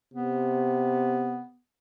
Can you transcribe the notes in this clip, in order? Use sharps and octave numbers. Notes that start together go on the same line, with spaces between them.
C3 B3